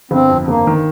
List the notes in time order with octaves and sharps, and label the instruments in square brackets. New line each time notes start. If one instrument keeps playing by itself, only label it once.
[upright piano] G1 [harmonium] C4
[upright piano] F2
[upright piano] G1 [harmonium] A#3
[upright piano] D#3